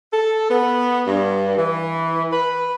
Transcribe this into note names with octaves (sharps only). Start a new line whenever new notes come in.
A4
B3
G2
E3
B4